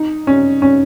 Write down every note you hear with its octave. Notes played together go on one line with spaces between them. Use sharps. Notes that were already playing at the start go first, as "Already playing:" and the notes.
Already playing: D#4
C#4
C#4